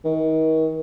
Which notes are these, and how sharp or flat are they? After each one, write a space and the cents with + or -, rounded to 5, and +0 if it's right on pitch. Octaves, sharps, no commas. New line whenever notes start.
D#3 +35